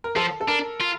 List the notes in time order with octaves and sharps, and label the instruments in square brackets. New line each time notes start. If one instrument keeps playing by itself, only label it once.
[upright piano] A#4
[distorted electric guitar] F3 [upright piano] A4
[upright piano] A4
[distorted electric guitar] D4 [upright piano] A#4
[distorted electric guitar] F4